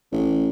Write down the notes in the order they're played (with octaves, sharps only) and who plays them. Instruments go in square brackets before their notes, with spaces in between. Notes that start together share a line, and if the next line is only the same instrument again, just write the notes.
[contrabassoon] A1